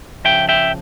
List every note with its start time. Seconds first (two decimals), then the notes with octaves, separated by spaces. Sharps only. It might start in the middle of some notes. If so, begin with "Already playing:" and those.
0.25 C#3 F3 E5 G5
0.49 E5 G5